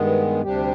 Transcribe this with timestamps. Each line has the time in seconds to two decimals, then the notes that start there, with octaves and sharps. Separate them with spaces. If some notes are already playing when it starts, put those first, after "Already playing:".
Already playing: G2 D#3 G#3 B3
0.42 D2 C3 G3 D4 G4